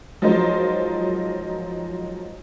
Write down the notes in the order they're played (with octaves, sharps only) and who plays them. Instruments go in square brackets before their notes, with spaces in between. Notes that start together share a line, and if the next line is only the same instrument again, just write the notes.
[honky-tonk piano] F3 F#3 G#3 D#4 A#4 C5